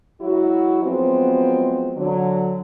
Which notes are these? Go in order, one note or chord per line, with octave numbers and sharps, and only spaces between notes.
F#3 G#3 E4 F#4
F3 F#3 G#3 B3 C4
D3 F#3